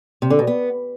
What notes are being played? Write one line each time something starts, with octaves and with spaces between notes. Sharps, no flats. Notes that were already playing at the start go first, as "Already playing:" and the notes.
C3
D3
B2
B3